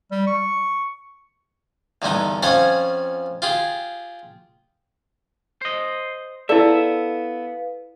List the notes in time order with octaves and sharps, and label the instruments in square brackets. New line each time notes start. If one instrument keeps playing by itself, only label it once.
[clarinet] G3
C#6
[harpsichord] E2 G2 D3 B3 D#4
F2 C#4 F4 C#5 F#5 G#5
F4 G4 G#4
[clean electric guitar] C5 D#5
[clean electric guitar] B3 E5 [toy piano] E4 D5 [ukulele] A4 A5 [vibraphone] B4 F5